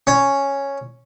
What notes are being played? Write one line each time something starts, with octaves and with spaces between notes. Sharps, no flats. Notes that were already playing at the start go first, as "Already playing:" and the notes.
C#4